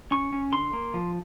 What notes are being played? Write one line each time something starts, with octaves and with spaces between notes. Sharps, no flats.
C#4 C#6
C#4
D3 C6
A#3
F3